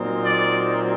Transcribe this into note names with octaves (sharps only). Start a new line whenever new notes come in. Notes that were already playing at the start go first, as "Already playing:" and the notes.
Already playing: A#2 F#3 C4 D#4
D5